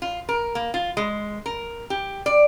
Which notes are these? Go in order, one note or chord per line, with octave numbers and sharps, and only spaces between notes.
F4
A#4
A#3
F4
G#3
A#4
G4
D5